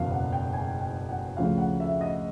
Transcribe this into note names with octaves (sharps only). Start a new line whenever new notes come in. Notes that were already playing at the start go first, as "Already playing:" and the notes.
Already playing: F#1 E2 B2 F5
F#5
G5
G#5
G5
F#5
D2 C#3 F3 F5
F#5
E5
D#5